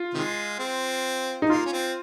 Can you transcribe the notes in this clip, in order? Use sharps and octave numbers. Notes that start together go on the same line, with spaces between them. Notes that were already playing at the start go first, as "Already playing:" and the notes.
Already playing: F4
C3 D#3 G#3
C4
D#4
A#3 F4
C#4
C4